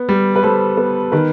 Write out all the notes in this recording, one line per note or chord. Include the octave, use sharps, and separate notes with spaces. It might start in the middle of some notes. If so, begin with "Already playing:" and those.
Already playing: B3
G3
B4
G3 A4 C5
B3
D#3 B4